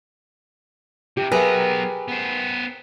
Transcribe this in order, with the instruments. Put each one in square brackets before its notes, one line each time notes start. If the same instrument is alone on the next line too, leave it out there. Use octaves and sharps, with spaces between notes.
[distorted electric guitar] C3 E3 [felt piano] G4
[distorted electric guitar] F#3 B3 [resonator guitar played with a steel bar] G4 G#4 A#4 [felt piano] B4 E5
[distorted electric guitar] B3 C5